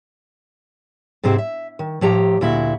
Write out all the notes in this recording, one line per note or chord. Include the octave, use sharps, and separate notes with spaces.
G#2 C3 C4 E4 G4
E5
D#3
A2 F3 G4 A#5
D2 A#2 E4 F#4 E5